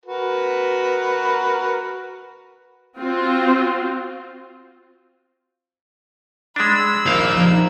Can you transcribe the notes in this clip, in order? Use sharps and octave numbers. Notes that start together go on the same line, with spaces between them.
F#4 A#4 B4
C4 F4 F#4
G#3 D4 B5 E6
A#1 D#3 A#3 F5
F3 D#4